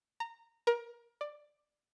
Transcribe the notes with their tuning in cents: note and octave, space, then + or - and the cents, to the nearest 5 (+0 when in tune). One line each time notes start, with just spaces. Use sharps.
A#5 -20
A#4 +25
D5 +15